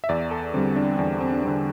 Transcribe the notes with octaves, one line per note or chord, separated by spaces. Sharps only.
E5
E2 D5
A4
D3 G3 C4
D4
E2 D4
C4
D4
D3 G3 C4